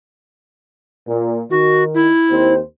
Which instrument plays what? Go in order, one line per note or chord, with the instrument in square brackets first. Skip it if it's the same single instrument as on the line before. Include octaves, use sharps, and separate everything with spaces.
[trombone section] A#2
[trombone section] D#3 [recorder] F#4
[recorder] E4
[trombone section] D#2 C4 C5